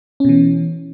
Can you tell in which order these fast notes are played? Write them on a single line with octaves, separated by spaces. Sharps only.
C#4 B2 E3